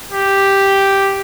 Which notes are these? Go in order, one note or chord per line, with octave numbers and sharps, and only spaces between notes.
G4